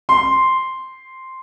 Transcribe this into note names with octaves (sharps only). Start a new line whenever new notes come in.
C6